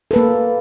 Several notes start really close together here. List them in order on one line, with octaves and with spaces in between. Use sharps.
A4 B4 A#3